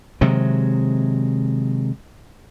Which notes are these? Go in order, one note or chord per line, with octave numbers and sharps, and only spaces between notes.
C3 D#3 F#3 G#3